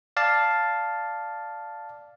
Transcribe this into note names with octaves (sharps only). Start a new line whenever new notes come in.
D5 F5 A5